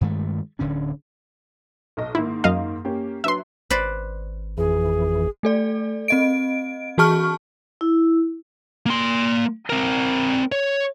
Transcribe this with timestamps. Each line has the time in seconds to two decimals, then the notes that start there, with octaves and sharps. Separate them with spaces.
0.01 G2 D#3 G#3 A3
0.59 D1 D3 C#4 D4
1.97 B1 D#5
2.15 G#2 D#3 A#3 E4
2.44 F#2 D#5 F5
2.85 A#3 C#4 G4
3.24 F#3 D4 B4 E5 C6
3.70 G#1 B4 C5 D5
4.58 F2 E3 G#4
5.43 A3 A4 D5
6.08 C4 D#5 D7
6.98 E3 F#4 G#4 A5 C#6 F6
7.81 E4
8.86 A#3 C6
9.70 C4 A#4
10.52 C#5